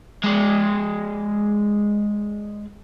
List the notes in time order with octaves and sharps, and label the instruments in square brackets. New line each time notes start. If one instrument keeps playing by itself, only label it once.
[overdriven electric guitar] G#3 D5